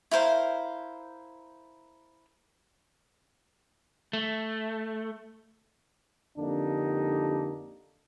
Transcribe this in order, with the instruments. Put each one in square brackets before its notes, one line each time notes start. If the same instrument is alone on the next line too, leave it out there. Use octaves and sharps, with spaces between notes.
[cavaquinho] E4 A#4 C5 F5
[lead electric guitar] A3
[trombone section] F2 D3 A#3 D4 D#4 G4